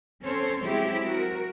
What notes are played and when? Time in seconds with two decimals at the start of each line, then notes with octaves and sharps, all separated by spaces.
0.21 C4 C#4 A4 C5 C#5
0.62 F#3 G#3 C4 E4 G4 G#4
1.06 F#4 A#4